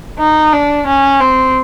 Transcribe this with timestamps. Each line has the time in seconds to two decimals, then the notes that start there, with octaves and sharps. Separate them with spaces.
0.19 D#4
0.53 D4
0.87 C#4
1.20 C4